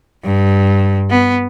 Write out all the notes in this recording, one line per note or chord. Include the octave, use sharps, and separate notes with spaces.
G2
B3